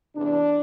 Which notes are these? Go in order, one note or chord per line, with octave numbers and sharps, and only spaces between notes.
E2 C3 E3 D4